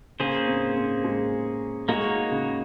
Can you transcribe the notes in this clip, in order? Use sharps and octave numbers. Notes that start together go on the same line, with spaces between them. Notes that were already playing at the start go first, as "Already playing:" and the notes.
C#3 A#3 C#4 G#4 C5
C4
C4
G#3
G#3 A#3 D#4 F#4 C#5
C#3